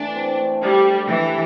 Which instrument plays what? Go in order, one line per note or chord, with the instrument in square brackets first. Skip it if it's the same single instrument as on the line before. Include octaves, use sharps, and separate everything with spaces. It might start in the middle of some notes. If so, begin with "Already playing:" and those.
Already playing: [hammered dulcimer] E3 A3 [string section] D4
[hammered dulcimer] C4
A3
[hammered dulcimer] D3 [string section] G3
[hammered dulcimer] G4
[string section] E3 [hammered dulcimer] E4